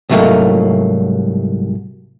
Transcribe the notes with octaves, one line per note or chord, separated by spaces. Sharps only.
C2 G#2 F#3 A3 A#3